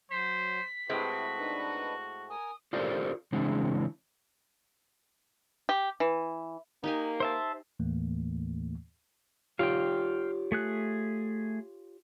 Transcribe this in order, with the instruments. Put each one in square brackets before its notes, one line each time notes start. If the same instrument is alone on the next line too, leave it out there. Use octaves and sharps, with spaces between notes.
[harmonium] F#3 [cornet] C5 [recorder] B6
[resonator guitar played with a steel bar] A2 G#3 C4 [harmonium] E4 G4 B4 [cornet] F#4
[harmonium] D4 D#4 B4
[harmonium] A#4 G#5 [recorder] D#6
[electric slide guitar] F4 G4 A4 A#4 C5 D5
C#3 E3 G#3 C4 D4
[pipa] G4
E3
[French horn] A#3 [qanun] D#4 G4 G#5
[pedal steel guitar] C5 E5 A5
[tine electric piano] D#2 A2 E3 A3 A#3
[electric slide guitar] F4 G4 C#5 [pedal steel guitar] F5 G5
[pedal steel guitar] A3 G#4 F#6